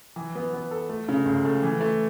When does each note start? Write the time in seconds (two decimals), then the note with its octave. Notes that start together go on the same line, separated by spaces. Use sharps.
0.16 E3
0.35 B3
0.53 B3
0.71 A4
0.89 A3
1.09 C#3
1.26 C#2
1.45 A3
1.63 E3
1.81 A3